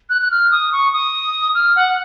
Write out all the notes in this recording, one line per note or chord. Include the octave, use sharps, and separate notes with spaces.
F#6
F#6
F6
D#6
C#6
D#6
F6
F#5